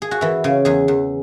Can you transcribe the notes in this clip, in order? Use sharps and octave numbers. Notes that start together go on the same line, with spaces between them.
G#4
F#4
E3 E4
C#3
E2 G#4
E2